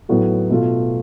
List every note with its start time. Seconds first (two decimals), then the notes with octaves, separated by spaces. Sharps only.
0.09 A2 F#3 B3 F#4 A4
0.50 B2 A3 F4